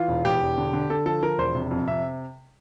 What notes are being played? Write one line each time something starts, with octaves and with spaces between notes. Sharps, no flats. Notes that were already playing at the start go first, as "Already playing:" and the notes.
Already playing: E3 F4
E1
E2 G4
E1
D3
D3
D3 A4
F3 A4
F3 A#4
E1 C5
C3
F2
C3 E5